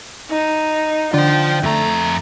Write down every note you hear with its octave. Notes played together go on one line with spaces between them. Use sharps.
D#4
D3 F4 C5 G5
F2 A3 A#5